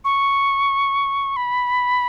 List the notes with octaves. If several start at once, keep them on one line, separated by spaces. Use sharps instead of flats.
C#6
B5